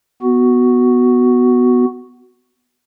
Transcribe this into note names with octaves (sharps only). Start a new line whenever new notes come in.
B3 F#4